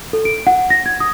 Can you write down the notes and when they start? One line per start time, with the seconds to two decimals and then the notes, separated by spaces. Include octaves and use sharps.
0.13 A4
0.25 D7
0.47 F#5
0.70 A#6
0.86 G#6
1.00 D#6